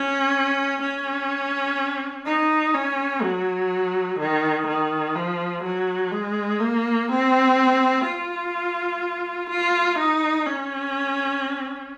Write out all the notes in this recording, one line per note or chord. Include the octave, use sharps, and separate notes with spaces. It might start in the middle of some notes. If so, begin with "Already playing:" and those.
Already playing: C#4
C#4
D#4
C#4
F#3
D#3
D#3
F3
F#3
G#3
A#3
C4
F4
F4
D#4
C#4